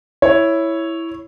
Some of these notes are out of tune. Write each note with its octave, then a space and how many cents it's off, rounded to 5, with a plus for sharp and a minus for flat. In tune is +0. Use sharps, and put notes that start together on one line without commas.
E4 +0 C#5 +0